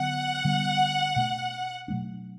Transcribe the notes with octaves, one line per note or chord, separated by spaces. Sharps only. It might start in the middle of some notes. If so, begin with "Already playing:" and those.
Already playing: D3 F#3 B3 F#5
D3 G3 B3
B2 A3 D4
B2 F#3 A3 D4